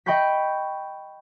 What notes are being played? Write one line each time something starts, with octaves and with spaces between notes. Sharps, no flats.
D#5 G5 B5 C#6 G6 B6